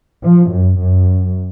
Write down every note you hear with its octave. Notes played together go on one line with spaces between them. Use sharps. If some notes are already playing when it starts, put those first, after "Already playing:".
F3
F#2
F#2